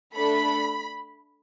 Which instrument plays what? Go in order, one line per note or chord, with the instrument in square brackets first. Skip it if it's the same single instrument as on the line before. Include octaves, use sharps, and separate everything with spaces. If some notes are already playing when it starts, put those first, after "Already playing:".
[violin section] A3 D4 A4 B5